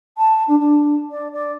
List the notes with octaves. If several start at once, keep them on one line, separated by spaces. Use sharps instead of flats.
A5
D4
D4
D5
D5